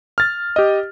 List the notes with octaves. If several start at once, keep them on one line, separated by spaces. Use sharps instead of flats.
F6 A6
G4 D#5